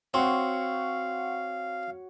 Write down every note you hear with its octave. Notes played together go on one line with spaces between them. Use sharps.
C4 F#4 C#5 F5 F#5 C6